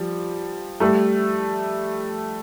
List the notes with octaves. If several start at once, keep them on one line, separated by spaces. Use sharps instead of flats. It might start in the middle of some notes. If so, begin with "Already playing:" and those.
Already playing: F3 G3
G3 A3